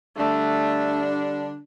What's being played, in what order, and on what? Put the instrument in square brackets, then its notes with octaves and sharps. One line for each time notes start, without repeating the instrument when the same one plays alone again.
[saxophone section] D3 G3 D4 [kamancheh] A3